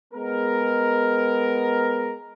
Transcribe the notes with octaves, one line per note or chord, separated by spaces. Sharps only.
G#3 B3 A#4